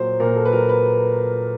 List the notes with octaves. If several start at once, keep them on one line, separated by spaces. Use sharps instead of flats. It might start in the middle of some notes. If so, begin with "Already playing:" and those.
Already playing: A#2 F#3 C5
A#2 A#4
A4
B4
F#3 A#4
B4